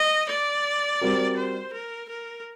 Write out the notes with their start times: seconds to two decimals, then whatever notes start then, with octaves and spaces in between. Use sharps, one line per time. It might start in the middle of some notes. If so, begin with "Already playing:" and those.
Already playing: D#5
0.30 D5
1.01 G3 C4 F#4 A#4
1.37 C5
1.73 A#4
2.09 A#4